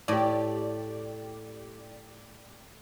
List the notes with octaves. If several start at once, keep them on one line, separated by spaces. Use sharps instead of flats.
A2 G4 D5